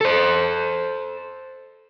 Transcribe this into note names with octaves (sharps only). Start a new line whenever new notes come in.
A4 C5